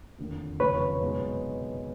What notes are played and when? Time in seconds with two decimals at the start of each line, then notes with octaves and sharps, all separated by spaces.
0.18 F1 D#2 D3
0.60 F1 D#2 C#3 B4 C#5
1.02 B2 G#3 B3 D#4